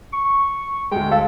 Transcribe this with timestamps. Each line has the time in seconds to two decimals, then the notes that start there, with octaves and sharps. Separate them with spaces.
0.13 C#6
0.91 D2 G#3 G5
1.11 A4 F5